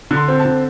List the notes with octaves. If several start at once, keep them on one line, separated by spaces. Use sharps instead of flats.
D3
C6
C4
A5
D3